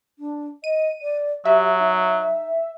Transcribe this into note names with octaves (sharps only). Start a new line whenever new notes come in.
D4
D#5 D#7
D5
F#3 G4 E5
D#4